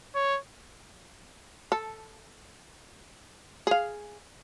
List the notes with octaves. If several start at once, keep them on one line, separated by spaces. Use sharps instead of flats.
C#5
A4
G#4 F5